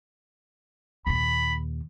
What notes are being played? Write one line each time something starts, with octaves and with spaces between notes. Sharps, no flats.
D#2 A#2 B5